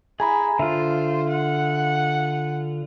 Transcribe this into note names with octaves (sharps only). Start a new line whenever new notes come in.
E4 G#4 G#5 A#5 B5
D3 F4 C5 E5
F#5